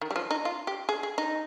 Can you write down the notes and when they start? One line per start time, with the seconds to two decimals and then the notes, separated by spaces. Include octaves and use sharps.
0.01 D#3
0.11 G3
0.16 F3
0.31 D#4
0.45 F4
0.67 G4
0.89 G#4
1.03 G#4
1.18 D#4